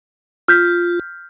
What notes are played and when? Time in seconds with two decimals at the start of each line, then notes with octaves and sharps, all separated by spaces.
0.48 F4 F6 G6 B6